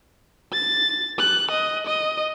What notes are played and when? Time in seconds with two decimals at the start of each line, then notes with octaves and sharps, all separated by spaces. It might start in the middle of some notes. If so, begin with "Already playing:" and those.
0.53 A6
1.19 F#6
1.51 D#5
1.86 D#5